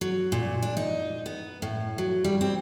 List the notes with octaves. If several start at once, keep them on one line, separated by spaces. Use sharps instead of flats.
F#3
A#2
D4
D#4
B3
A2
F#3
G3
C4